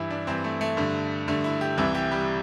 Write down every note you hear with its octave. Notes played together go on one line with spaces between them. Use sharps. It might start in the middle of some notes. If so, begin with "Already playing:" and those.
Already playing: G2 E3 E4
D4
G2 E3 C4
A3
A3
G2 D3
G2 D3 A3
E4
G4
C2 C3 E3 E4
G4
G3